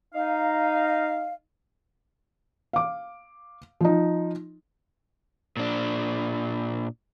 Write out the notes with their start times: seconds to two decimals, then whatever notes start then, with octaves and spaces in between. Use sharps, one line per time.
0.14 D#4 F5
2.73 F5 D6
3.81 F3 D#4
5.57 A#2 D4